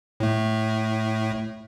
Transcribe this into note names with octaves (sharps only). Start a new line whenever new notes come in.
A2 A3